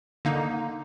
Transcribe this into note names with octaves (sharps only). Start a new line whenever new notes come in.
D3 A#3 D#4